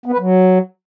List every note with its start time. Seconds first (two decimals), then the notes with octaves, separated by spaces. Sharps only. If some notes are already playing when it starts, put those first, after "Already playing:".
0.06 B3
0.12 B4
0.19 F#3